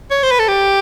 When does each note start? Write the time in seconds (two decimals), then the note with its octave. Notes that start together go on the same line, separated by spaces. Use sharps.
0.11 C#5
0.23 C5
0.31 B4
0.39 A4
0.48 G4